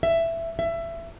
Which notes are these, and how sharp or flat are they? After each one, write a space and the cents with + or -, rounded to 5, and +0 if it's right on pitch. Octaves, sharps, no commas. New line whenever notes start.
E5 +10
E5 +20